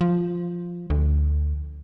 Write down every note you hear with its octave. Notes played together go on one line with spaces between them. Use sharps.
F3
D2